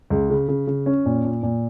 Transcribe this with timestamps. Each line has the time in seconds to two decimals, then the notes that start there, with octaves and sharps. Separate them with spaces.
0.10 C#2
0.30 C#3
0.48 C#3
0.67 C#3
0.86 C#4
1.06 A#2
1.24 A#2
1.43 A#2